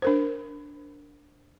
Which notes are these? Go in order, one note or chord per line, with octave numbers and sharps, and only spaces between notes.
D4 A#4 C5